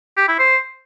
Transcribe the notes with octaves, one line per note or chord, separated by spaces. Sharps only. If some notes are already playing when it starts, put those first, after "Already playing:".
G4
E4
C5